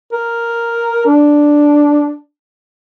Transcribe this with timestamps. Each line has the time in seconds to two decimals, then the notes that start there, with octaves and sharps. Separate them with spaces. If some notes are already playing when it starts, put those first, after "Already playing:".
0.13 A#4
1.06 D4